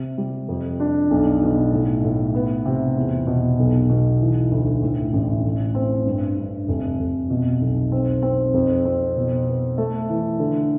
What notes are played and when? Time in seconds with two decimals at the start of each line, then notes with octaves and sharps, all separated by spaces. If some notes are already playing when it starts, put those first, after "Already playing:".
Already playing: C3
0.18 G3
0.48 F2
0.80 D4
1.10 B1
1.42 B2
1.73 A2
2.04 A2
2.34 B3
2.65 C3
2.97 E2
3.27 B2
3.59 B1
3.89 B2
4.20 E3
4.51 D2
4.83 A2
5.13 A1
5.44 A2
5.75 C4
6.06 G2
6.37 G2
6.68 F1
6.99 F1
7.30 B2
7.61 B1
7.92 C4
8.22 C4
8.54 F2
8.85 C4
9.17 B2
9.47 B3
9.78 A3
10.09 E3
10.39 D3